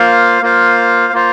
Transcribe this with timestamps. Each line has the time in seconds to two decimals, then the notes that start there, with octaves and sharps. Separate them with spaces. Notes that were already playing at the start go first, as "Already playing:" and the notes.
Already playing: A#3 F4 C5 F5
0.42 A#3 F4 C5 F5
1.13 A#3 F4 C5 F5